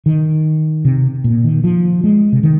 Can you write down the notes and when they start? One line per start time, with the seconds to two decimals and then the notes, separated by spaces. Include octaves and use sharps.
0.06 D#3
0.85 C3
1.24 A#2
1.44 D#3
1.64 F3
2.04 G#3
2.32 C3
2.43 D#3